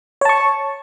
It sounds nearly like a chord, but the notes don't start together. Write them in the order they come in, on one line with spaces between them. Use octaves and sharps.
C#5 A5 C#6